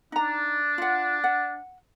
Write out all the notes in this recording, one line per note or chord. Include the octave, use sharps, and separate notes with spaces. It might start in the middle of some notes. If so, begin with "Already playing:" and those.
D4 D#4 A#5
F4 F#5
F#5